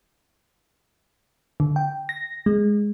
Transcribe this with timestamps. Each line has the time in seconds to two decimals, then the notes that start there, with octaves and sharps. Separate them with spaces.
1.60 D3
1.76 G5
2.09 A#6
2.46 G#3